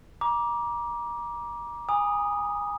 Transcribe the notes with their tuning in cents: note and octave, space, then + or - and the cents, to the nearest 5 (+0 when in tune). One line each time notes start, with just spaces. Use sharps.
A#5 +30 D6 +0
G#5 -20 B5 -40 D#6 -5